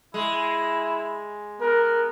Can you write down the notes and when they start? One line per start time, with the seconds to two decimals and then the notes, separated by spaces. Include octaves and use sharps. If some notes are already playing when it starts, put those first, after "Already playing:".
0.14 G#3 E4
1.61 B3 A#4